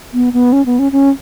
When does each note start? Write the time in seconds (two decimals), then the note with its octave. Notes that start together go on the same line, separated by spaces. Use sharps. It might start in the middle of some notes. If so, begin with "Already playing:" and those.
0.14 B3
0.33 B3
0.53 C#4
0.66 B3
0.79 C#4
0.92 C#4